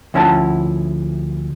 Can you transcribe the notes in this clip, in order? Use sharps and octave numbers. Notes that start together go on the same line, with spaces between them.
D2 F3 C#4 E4 F#5 A5